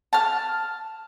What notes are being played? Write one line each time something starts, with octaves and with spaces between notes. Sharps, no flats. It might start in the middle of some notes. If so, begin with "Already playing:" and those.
A5 F6